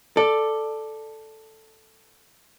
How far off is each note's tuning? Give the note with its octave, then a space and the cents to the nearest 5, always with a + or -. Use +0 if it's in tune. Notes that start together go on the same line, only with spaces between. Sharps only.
A4 +0 D5 +10